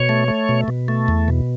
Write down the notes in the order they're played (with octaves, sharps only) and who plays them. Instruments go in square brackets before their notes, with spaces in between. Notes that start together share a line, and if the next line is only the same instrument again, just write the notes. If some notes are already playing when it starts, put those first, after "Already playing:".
Already playing: [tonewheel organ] B2 C#5
A3
A3
B2
B2
A3
E2
B2